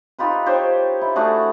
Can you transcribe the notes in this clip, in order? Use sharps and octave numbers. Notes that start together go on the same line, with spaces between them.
D#4 F4 G4 B4
F4 G4 C5 C#5
E4
A3 D4 F#4 G#4